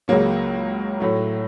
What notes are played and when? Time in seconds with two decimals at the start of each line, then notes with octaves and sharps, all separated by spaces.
0.08 C#2 C#3 F#3 A#3 C#4
1.00 A2 F#3 A3